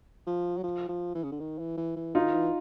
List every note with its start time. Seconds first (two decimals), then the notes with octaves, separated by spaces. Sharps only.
0.27 F3
0.58 F#3
0.64 F3
0.89 F3
1.15 E3
1.24 C#3
1.32 D3
1.40 D#3
1.59 E3
1.77 E3
1.96 E3
2.15 D#3 D#4 F4
2.34 E3